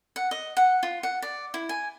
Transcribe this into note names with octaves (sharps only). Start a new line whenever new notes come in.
F#5
D#5
F#5
F4
F#5
D5
E4
G#5